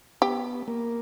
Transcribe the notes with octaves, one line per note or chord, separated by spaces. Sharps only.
B3 G4
A#3